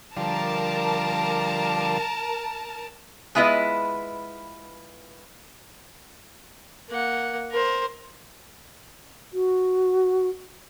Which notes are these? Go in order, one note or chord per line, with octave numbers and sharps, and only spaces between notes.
D3 F3 G3 A#4 A5
G#3 B3 E4 F4 B4 D#5
A#3 F#5
A#4 C5
F#4